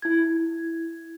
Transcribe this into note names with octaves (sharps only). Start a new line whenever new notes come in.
E4 G#6